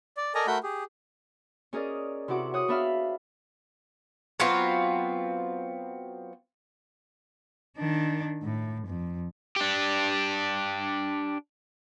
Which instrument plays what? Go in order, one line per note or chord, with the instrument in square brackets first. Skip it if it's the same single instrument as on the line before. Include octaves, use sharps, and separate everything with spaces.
[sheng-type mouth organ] D5
A4 A#4 D5 D#5 G#5 A#5
A3 F#4 A#4 F#5 B5 G6
G4 G#4
[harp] C#4 G#4 A#4 D5 D#5
C3 E4 F#4 F#5 D6
C#5 F#5 D#6 F#6
B3 D4 B4 E5 F5 F6
[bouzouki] F#3 B3 C4 F4
[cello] D#3 D4
A2
F2
[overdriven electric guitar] D4 G4